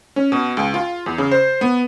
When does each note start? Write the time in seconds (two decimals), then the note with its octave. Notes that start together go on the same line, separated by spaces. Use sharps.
0.16 C#4
0.32 B2
0.57 C#2
0.74 F4
1.06 E2
1.18 C#3
1.31 C5
1.61 B3